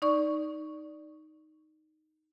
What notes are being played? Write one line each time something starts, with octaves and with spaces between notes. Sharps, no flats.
D#4 D5 C#6